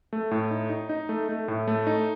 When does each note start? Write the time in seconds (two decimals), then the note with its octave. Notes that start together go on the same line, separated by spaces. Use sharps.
0.13 A3
0.31 A2
0.51 D#4
0.70 D#4
0.89 D#4
1.09 A3
1.29 A3
1.48 A2
1.68 A3
1.87 D#4